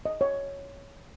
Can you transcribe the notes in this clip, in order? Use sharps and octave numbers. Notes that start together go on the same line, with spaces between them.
D#5
C#5